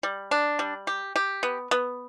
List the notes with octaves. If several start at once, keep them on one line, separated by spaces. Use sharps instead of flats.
G3
D4
G3
G4
G4
B3
B3